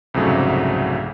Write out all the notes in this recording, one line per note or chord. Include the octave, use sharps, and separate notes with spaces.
C2 F2 G#2 C#3 F#3 A3